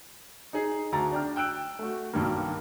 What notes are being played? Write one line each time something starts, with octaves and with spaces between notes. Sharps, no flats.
D#4 G#4
D2 A5 A#5 A6
D4 G5 F6
G5 E6 F#6 D7
A3 F#4
B1 G2 D#3 G3 A#3